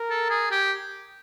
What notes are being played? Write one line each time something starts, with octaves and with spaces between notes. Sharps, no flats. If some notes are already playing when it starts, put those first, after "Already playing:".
Already playing: A#4
A4
G#4
G4